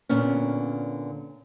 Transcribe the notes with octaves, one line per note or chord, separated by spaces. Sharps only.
A#2 D3 B3 C#4